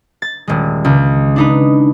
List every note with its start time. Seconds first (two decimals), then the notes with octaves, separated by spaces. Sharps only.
0.22 A6
0.48 D#1 G#3
0.85 C#2
1.36 D4 D#4 B4